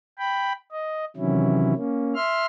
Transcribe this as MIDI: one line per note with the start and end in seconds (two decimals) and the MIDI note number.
0.18 0.52 79
0.18 0.52 83
0.72 1.05 75
1.17 1.73 48
1.17 1.73 51
1.17 1.73 52
1.17 1.73 54
1.17 1.73 61
1.17 1.73 64
1.75 2.15 58
1.75 2.15 61
2.15 2.46 76
2.15 2.46 84
2.15 2.46 89